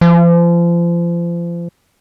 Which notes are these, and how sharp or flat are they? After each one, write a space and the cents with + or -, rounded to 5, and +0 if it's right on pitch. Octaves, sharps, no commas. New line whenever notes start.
F3 -35